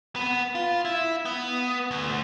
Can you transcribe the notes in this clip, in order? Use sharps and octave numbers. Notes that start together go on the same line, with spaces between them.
B3
F4
E4
B3
D2